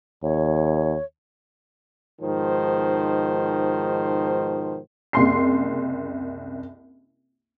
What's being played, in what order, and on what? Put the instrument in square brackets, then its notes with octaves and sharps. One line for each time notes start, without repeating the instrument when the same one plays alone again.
[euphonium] D#2 [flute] C#5
[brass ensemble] G#2 B2 D#3 F3 C5
[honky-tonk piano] F#1 C2 C6 C7